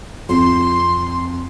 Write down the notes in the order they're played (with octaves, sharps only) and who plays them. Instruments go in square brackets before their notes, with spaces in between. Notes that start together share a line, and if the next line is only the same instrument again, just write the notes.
[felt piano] F2 [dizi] C6